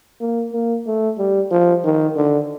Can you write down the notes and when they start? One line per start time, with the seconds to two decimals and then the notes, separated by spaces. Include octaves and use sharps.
0.21 A#3
0.53 A#3
0.87 A3
1.18 G3
1.51 F3
1.84 D#3
2.16 D3